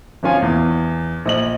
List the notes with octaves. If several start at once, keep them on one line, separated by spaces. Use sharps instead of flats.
G#1 F3 C#4 F4 G#5
E2
A#1 D#5 F#7